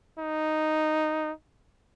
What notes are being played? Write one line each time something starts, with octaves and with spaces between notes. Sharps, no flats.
D#4